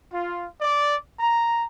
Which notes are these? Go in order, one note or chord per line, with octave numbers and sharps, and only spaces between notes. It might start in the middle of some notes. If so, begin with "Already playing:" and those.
F4
D5
A#5